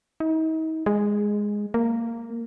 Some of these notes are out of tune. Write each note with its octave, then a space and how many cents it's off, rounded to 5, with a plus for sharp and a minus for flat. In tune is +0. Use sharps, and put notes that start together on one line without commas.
D#4 +40
G#3 -5
A#3 -10